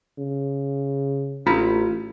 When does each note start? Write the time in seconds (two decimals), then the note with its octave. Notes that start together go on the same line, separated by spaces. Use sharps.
0.19 C#3
1.46 A1 F4 A#5 B5